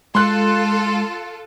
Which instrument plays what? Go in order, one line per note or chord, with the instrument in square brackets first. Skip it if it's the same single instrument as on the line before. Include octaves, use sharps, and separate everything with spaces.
[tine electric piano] G#3 [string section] F4 A4 [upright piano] C6 F#6